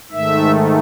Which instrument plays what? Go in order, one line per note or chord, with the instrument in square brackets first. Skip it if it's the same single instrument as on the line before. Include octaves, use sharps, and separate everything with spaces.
[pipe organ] G#2 D#3 A3 E5